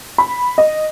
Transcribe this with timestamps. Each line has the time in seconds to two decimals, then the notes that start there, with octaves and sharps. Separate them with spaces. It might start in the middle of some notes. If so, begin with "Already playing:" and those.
0.18 B5
0.58 D#5